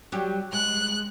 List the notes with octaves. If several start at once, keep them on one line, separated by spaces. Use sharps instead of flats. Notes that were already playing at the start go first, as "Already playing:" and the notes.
F#3 G3 G4
G#3 F#6